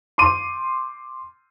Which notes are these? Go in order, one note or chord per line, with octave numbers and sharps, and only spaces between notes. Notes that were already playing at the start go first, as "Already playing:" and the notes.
C6 D6 D#7